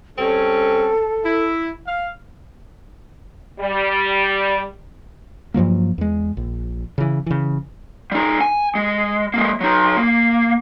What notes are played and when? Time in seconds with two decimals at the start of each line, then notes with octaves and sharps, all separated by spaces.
0.17 G3 C4 C#4 A4
1.24 E4
1.87 F5
3.60 G3
5.54 G2 F3 F#3 A#3
5.98 E2 G#3
6.37 A#1
6.98 C#3 E3
7.26 C#3 E3
8.12 G3 D#4
8.41 G#5
8.75 G#3
9.34 G#3 A#3
9.61 F#3 D#4
9.97 A#3